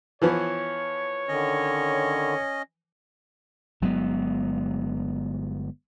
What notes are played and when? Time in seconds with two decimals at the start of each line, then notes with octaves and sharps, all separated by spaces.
0.22 E3 F3 B3 C#5
1.28 D3 D#3 C#4 D#5
3.81 G1 F#3 G#3 B3